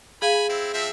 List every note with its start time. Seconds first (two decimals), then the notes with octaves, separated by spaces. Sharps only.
0.22 G#4 F5 G#5 B5
0.49 C4 E4
0.74 F3 C4 E5